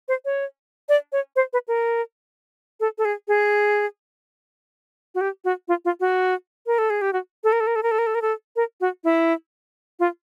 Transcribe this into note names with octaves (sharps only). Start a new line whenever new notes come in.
C5
C#5
D5
C#5
C5
B4
A#4
A4
A4
G#4
G#4
F#4
G4
F#4
F4
F4
F#4
A#4
A4
G#4
G4
F#4
A4
A#4
A4
A#4
A4
A#4
A4
A#4
A4
A#4
A4
A#4
F#4
E4
F4